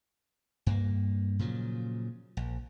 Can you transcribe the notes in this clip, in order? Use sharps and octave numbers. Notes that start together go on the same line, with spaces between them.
G2 A#3
A#2 C#3 F3 F#3
A#1